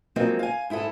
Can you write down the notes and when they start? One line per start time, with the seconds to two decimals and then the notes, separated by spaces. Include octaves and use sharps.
0.16 F3 F#3 G#3 A#3 C4 D#4
0.39 F5 G#5
0.70 G#2 E4 G#4 A4